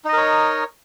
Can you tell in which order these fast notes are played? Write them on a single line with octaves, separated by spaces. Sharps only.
D#4 D#5 A#4 C#5